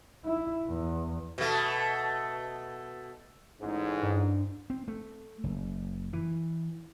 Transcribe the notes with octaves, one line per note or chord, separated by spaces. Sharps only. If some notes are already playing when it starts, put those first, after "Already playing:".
E4
E2
B2 A3
A1 G#2
G2
C4
A3
F#1
E3